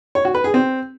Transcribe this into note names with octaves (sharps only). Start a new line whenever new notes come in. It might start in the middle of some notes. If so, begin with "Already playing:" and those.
C#5
F#4
B4
G#4
C4